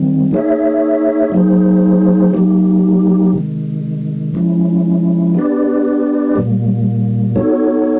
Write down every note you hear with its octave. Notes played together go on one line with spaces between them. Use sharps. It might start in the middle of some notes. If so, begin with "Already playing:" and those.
Already playing: D#3 G3 C4
A#3 D#4 G#4 C#5 E5
F#3 A#3 D#4 G#4 C5
F#3 A#3 D#4 G4
C3 D#3 G#3
F3 G#3 C#4 E4
B3 D4 G4 B4 D5
A#2 G3 A#3
B3 D#4 F#4 A4 C#5